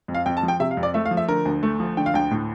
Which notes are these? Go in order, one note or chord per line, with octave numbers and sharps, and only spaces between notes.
F2
F5
F2 G5
A5
F3
G5
C3 E5
F5
F2
D5
A3 E5
F5
F3
E5
D3 A#4
D2
A3
F3
D3 G5
F5
D2 G5
A2